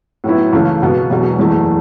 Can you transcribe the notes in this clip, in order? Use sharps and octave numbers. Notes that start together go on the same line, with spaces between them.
A2 F#3 B3 E4
C#2 C#3 E3 A3 C#4
C#2 B2 B3 F#4
E1 E2 B2 F#3
F#1 E2 E3 A3